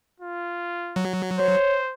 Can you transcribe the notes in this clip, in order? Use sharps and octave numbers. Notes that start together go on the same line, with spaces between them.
F4
F#3
C5 C#5